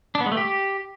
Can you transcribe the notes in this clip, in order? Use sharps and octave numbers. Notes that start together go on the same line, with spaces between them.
D4
B3
G#3
A3
G4